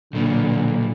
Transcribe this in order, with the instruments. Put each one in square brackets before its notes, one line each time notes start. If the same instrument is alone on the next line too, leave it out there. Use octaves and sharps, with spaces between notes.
[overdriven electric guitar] B1 A#2 [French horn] D3